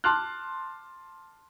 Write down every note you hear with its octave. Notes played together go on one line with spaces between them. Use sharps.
A5 C6 D6 F6 F#6